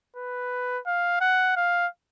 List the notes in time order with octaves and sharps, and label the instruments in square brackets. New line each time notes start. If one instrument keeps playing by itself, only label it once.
[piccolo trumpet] B4
F5
F#5
F5